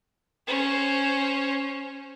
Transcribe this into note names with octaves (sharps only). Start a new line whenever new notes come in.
C#4 C5